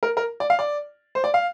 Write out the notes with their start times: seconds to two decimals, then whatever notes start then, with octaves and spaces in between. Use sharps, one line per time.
0.03 A#4
0.17 A#4
0.40 D5
0.50 F5
0.59 D5
1.15 C5
1.24 D5
1.34 F5